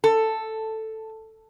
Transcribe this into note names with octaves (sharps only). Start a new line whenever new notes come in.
A4